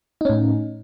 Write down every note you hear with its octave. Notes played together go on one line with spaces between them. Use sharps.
A2 C#4 D#4